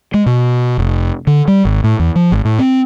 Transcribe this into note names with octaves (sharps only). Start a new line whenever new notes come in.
G#3
B2
F1
D3
G3
G#1
A2
E2
F3
G#1
A2
C4